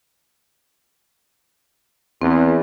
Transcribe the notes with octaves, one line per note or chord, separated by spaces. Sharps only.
E2 C4